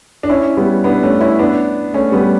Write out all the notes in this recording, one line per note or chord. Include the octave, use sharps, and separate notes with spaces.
D4
C#4 E4
G3 B3
B3 D4
A3 C#4
C#4 E4
B3 D4
A3 C#4
G3 B3